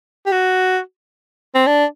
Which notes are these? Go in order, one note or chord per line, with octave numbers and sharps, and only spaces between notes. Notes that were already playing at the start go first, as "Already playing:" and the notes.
G4
F#4
C4
D4